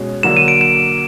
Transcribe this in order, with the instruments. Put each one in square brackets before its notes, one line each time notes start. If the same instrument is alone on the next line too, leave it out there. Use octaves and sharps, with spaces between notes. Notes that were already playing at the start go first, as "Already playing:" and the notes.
Already playing: [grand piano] B2 G#3 C#4
[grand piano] D3 F#3 A#3 [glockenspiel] E7
[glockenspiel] D#7
D7
E7